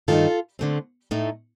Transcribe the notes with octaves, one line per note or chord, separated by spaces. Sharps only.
G2 D#3 A3 D#4 F4 A4
D3 A3 C4
A2 A3 D#4